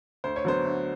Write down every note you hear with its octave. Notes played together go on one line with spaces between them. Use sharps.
D2 C5
C#5
D3 F#3 B3 C5
D2